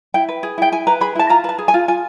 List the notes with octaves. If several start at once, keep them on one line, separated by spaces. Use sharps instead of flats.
E4 G5
B4
G#4
E4 G5
E4 G#5
B4 A#5
G#4 B5
E4 A5
F4 A#5
B4 A5
G#4
G#5
F4
F4 G#5